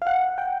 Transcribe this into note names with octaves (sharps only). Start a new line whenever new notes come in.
F5
F#5
G5